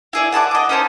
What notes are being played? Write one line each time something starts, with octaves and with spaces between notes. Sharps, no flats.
E4 G#4 D5
F#5 A5 C6 D6
D#5 D6
C#4 D#4 C5 A5